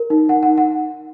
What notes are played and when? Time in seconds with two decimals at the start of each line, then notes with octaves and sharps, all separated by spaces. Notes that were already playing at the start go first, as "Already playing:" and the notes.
Already playing: A#4
0.10 D#4
0.29 D#4 F#5
0.43 F#5
0.47 D#4
0.58 F#5